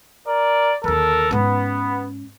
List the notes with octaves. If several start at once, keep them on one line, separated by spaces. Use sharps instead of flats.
A#4 D5
D#2 D3 A4 A#4
G#2 B3 C#4